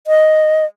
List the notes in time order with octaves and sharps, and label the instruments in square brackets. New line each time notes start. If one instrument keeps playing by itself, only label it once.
[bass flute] D#5